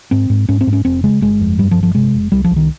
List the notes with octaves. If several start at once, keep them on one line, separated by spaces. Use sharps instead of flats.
G#2 C4
G#2
G#2 C#4
C4
G#2
C#4
F1 C4
C#3 G#3
G1 G#3
F2
G2 G3
F3
G1
F3
C3 G#3
F1
C2 G3
F3
C2
D#3